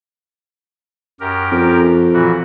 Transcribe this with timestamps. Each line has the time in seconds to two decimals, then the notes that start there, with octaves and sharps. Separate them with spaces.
1.20 F#2 G4 A#4
1.51 F2
2.13 A#2 E3 F#4